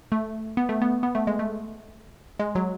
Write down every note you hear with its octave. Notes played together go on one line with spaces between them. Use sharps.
A3
B3
A3
B3
B3
A3
G#3
A3
G#3
F#3